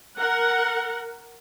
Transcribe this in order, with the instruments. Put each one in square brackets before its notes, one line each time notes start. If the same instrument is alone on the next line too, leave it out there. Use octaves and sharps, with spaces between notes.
[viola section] A#4 F#5